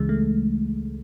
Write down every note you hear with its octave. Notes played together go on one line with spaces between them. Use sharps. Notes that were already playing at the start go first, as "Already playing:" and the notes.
Already playing: C#2 C#3 E3 G#3
A3